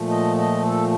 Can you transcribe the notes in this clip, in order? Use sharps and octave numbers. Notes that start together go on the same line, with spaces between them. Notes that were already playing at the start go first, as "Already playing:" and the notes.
Already playing: A#2 F3 A3
D#5
D#5
A4